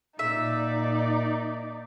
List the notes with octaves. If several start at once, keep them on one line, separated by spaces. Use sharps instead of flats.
A#2 D#4 D5 E5